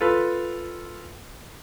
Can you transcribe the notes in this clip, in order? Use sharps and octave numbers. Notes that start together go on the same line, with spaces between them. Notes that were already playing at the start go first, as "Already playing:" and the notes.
F4 A4 B4